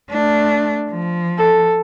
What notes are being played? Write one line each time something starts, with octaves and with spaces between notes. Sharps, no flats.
A3 D4
F3
A4